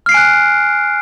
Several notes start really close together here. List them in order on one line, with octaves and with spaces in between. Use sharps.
F6 C7 D7 G#5 F#6